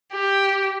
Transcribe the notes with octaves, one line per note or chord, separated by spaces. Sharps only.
G4